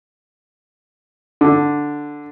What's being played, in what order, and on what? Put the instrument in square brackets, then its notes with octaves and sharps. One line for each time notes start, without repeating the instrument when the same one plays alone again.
[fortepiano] D3